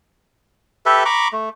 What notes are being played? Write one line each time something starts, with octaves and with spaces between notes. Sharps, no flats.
G4 A4 B4 E5
A#5 B5 C#6 D6
A3